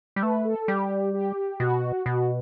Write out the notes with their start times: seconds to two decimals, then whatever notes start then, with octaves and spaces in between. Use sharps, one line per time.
0.16 G3
0.22 A3 B4
0.45 A4
0.68 G3 G4
1.14 G4
1.60 B2 F#4
2.06 B2 F#4